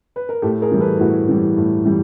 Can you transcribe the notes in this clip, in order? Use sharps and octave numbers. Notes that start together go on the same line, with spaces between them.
B4
A#4
A2 G4 A4
G#4 A#4
E3 G3
A4 B4
A2 E4 F#4
E3 G3
A2
E3 G3